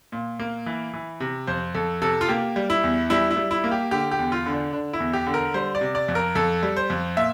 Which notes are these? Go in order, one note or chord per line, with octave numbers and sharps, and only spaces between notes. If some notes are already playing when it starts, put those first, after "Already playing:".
A#2
A#3
E3
E3
C3
F2 C5
F2 A4
C3 A4
F4
A#3 G4
G3
E4
E2
G3 E4
E4
G3
E4
A#3
G4
D3 G4
G4
E2
F4
D3
D4
D3 D4
E4
E2
G4
D3
A#4
G3 C5
D5
C3
D5
F2
A#4
F2 A4
G3
C5
F2
A#2 E5